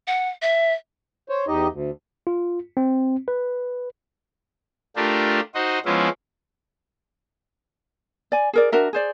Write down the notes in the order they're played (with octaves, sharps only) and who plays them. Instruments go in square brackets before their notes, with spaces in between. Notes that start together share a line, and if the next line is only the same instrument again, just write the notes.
[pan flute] F#5
E5
[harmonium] C5 C#5
E2 D#4 G4 D#5
D2
[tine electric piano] F4
C4
B4
[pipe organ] A3 D4 F4 G4 A#4
D#4 F#4 C5 D#5
F3 G#3 B3 C#4 E4 F4
[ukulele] D5 G#5
G#4 A#4 D5
D4 F#4 A#4 E5
G#4 C5 D5